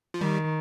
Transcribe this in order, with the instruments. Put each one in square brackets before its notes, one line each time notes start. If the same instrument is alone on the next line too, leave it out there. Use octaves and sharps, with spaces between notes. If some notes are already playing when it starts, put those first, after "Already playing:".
[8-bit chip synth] F3
[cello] D#3 [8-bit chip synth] G3